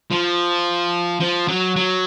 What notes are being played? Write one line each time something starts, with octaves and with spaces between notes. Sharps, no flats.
F3
F3
F#3
F#3